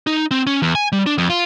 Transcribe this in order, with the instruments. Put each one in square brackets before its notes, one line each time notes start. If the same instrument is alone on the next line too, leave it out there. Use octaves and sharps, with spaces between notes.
[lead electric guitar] D#4
C4
C#4
E2
G#5
G3
D4
F2
F4